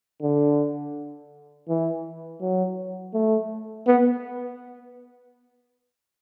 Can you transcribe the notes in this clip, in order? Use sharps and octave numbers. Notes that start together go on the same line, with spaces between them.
D3
E3
F#3
A3
B3